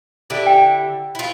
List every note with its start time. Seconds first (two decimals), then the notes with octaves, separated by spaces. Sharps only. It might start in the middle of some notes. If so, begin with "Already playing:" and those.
0.30 D3 E4 G4
0.47 G5
1.15 E4 F4